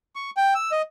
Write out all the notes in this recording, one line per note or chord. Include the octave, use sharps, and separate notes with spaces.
C#6
G5
E6
D#5